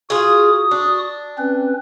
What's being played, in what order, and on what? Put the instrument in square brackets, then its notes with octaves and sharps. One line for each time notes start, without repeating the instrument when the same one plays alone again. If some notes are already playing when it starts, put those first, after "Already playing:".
[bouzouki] F4 G#4 [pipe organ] F#4 D#6
[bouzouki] D4
[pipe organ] C4 C#4 B4